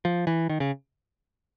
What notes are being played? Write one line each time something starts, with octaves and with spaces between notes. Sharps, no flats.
F3
E3
D#3
C#3